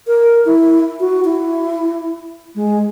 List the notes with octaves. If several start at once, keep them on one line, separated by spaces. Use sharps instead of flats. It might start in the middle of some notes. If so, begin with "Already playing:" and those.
A#4
E4
F#4
E4
G#3